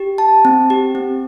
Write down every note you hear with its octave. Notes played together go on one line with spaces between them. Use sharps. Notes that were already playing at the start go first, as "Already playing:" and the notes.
Already playing: G4
A5
C4
G4
C4